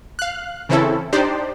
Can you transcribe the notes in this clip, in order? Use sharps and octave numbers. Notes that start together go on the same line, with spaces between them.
F5 F#6
C#3 E3 C4 C#4 E4 A4
D4 D#4 G4 C5 D5